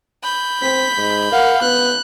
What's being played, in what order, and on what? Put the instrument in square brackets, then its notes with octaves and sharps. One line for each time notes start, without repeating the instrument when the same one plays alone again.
[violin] B5 G6
[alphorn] C4 [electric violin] B6
[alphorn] G#2
[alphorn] A#4 [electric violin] F5 F#5
[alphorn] B3 [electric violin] F#6